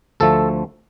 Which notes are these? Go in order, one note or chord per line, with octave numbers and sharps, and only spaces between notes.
D2 D3 F3 A3 A4